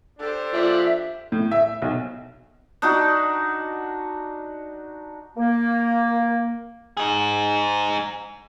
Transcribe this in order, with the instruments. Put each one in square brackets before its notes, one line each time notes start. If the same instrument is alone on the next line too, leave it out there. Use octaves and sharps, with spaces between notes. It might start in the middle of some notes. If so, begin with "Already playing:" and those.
[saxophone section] D4 A4 [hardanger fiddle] G4 C5
[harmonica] F3 D5 [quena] E5
[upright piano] A2
E5
B1
[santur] D4 D#4 F#4
[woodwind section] A#3
[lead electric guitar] D#4 G#4